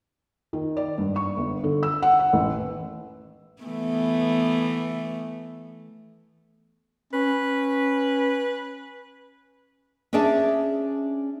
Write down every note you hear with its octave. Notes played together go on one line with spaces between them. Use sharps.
D#3
D5
G2
C#6
G1
D3
E6
F#5
F#5
A1
E3 A3 B3
C#4 B4
C#4 D4 G#4 D5 E5 A5